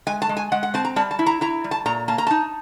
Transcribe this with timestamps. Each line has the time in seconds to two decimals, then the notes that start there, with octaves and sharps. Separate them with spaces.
0.07 G#3 G#5
0.22 A5
0.29 G#3
0.37 G#5
0.52 G#3 F#5
0.63 F#5
0.74 C4 A5
0.85 A#5
0.96 G3 A5
1.11 A5
1.19 E4
1.26 A#5
1.41 E4 A#5
1.64 G3
1.71 A5
1.86 A#2 A#5
2.08 A#3 A5
2.18 A#5
2.27 D#4 A5